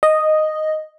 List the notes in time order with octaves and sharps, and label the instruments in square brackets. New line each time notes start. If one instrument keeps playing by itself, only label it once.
[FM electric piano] D#5